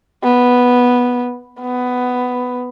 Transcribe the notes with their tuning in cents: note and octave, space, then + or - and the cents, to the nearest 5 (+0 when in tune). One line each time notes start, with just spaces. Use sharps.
B3 -5
B3 +10